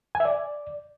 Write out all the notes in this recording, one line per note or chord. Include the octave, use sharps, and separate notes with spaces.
G#5
E5
D5